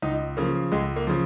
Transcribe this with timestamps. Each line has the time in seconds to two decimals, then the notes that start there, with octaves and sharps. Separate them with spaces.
0.02 C#2 D#4
0.37 C#3 F3 A#3
0.72 C#2 G#3
0.96 A#3
1.07 C#3 F3